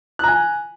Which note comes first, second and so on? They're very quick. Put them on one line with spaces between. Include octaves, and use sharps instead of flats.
F#6 A#5 G#5